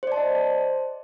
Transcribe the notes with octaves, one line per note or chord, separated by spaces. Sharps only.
C5 D5 D#5 A5